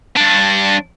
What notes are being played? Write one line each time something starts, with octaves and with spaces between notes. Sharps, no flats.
G2 D4